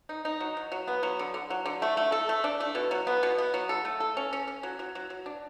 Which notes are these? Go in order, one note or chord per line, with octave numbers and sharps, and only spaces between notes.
D#4
D#4
F#3
F#3
F#3
B3
F#3
D3
D3
F#3
D3
A3
A3
A4
A3
D4
A3
B2
F#3
B3
B2
B3
F#3
A4
A3
A4
C#4
C#4
C#4
F#3
F#3
F#3
F#3
D4